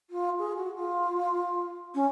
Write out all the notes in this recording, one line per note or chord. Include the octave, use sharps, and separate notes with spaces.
F4
G#4
F#4
F4
C#4